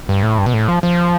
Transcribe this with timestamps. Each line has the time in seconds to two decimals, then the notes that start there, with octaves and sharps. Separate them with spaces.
0.09 G2
0.23 A2
0.38 G2
0.46 B2
0.54 A2
0.68 F3
0.83 F3